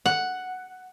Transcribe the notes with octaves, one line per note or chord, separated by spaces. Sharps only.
F#5